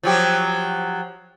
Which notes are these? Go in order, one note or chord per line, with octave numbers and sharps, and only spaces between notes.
F3 F#3 G4